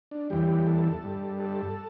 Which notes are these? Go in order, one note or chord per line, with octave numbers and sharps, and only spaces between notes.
D4
E2 E3 G3 G4
A4
G2 G3
A4